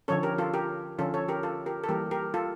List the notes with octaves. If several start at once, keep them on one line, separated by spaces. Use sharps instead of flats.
D3 F3 C#4 A4 C#5
G4 A#4
F4 A4
G4 A#4
D3 F3 C#4 F4 A4
A4 C#5
G4 A#4
F4 A4
G4 A#4
A4
E3 G3 A#3 G4 A#4
G4 A#4
F4 A4